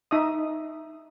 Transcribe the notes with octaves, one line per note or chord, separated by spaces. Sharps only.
D#4 E5 D#6